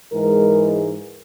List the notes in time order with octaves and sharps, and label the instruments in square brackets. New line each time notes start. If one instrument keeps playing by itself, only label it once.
[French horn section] G#2 E3 G#3 A#4